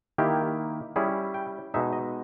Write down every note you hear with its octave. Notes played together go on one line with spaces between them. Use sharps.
D#3 A#3 E4 G4
G3 C#4 E4 G#4
G5
B2 G#3 D#4 E5
D#5